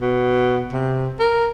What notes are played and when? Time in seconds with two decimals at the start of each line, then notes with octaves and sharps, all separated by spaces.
0.01 B2
0.72 C3
1.20 A#4